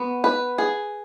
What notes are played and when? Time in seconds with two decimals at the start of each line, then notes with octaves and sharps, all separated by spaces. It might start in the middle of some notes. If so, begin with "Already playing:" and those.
Already playing: B3 F#4
0.24 B4
0.58 G#4